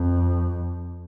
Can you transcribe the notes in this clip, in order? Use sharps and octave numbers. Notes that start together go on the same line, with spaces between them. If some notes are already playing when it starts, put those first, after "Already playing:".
Already playing: F2